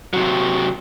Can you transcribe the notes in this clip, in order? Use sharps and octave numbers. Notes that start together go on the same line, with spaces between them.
C3 F#3